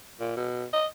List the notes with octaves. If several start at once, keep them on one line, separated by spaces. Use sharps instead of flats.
A#2
B2
D#5